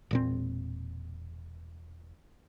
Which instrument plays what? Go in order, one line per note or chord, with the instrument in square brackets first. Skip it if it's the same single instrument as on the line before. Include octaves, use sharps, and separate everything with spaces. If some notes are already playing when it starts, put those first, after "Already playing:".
[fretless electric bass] E1 A#2 C4